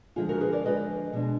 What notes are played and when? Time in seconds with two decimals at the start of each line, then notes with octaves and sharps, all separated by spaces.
0.16 D3 F3 G#3 F4 G#4
0.29 F#4 A#4
0.40 G#4 B4
0.53 A#4 D5
0.65 D3 F3 G#3 B4 D#5
1.13 B2 G#3 D4